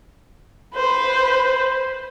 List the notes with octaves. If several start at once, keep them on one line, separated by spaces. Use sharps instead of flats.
B4 C5